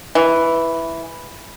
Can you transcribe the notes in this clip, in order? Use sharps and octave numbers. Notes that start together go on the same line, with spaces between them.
E3